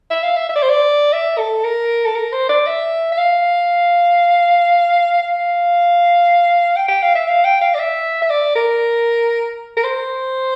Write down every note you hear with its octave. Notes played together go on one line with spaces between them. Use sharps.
E5
F5
E5
E5
D5
C5
D5
E5
A4
A#4
A4
A#4
C5
D5
E5
E5
F5
F5
G5
G5
F5
E5
F5
G5
F5
D5
E5
E5
D5
A#4
A#4
C5